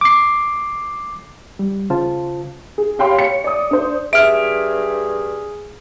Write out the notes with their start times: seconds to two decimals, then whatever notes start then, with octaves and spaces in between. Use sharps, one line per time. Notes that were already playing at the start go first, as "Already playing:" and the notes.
0.01 D6 C7
1.59 G3
1.90 C#3 F4 C5 A5
2.78 G#4
2.99 G4 C#5 F5 G5 B5 C6
3.19 C#5 C#7
3.44 D5 D#6
3.71 D4 C5
4.13 G2 G#4 E5 F6 D7